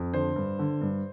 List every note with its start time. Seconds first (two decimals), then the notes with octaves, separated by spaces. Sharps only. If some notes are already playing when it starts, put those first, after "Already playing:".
Already playing: F2
0.13 D3 C5
0.36 G2
0.59 D3
0.81 G2